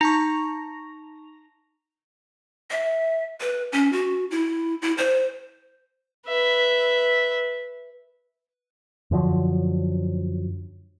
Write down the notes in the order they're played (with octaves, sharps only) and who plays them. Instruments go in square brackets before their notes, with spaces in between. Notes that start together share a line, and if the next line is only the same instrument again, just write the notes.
[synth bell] D#4 A5 C#6 [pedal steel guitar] A#5
[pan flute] E5
B4
C#4
F#4
E4
E4
C5
[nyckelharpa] B4 E5
[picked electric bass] F#2 D3 F3 F#3